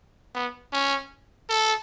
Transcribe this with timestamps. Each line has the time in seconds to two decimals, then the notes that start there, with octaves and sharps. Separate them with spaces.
0.35 B3
0.73 C#4
1.50 A4